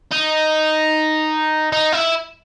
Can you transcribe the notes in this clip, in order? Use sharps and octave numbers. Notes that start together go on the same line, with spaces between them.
D#4
D#4
E4